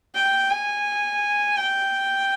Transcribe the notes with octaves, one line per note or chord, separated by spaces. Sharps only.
G5
G#5
G5